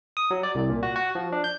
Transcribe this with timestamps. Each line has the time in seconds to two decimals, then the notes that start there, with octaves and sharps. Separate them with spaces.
0.17 D#6
0.31 F#3
0.43 D5
0.55 C2
0.70 A#2
0.83 F#4
0.96 F#4
1.15 F3
1.32 D4
1.44 G6